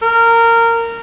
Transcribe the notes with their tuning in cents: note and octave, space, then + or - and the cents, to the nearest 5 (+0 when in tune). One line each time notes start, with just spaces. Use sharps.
A#4 -15